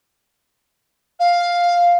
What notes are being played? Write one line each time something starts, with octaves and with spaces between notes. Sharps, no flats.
F5